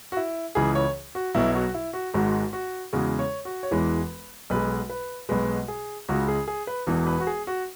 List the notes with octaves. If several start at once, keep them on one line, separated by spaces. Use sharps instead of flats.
F#4
E4
C#2 C#3 E3 G#4
C#5
F#4
B1 B2 F#3 E4
F#4
E4
F#4
G#1 G#2 G#3 F#4
F#4
E2 C#3 G#3 F#4
C#5
F#4
C#5
E1 E2 E3 G#3 B4
B1 B2 G#3 B4
B4
B1 B2 G#3 B4
G#4
C#2 C#3 G#3 F#4
G#4
G#4
B4
E1 E2 E3
B4
F#4
G#4
F#4